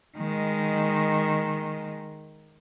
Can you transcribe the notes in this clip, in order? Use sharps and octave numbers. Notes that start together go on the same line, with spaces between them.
D#3 G#3